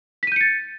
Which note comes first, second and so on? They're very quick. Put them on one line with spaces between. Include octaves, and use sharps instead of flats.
B6 D#7 G6 C#7 A6